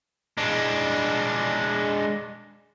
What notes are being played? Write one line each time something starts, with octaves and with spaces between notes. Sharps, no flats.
G#3 D4